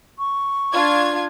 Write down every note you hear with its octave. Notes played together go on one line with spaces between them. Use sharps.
C#6
D4 F4 G#6